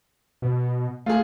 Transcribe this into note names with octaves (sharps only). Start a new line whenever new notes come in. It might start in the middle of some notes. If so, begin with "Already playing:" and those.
B2
A3 F4 G#4